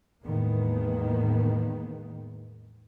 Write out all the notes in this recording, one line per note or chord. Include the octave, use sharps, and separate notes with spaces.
E2 A2 D#3 G#3 A#3 B3